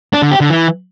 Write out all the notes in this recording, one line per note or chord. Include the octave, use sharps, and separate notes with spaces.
D4
D3
G4
D3
E3